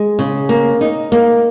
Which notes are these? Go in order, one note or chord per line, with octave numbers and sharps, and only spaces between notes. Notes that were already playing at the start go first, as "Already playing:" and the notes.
Already playing: G#3
C#3
A#3
D#4
A#3